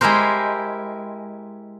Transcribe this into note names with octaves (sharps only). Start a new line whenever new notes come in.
G#3 E4 G4 A#4 C5